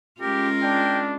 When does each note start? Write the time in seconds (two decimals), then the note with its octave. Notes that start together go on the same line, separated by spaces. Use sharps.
0.21 G#3 C#4 F4 G4 A#4
0.62 D4 G5